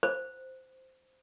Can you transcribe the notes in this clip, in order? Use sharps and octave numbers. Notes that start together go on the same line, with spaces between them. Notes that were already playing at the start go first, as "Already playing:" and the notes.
C5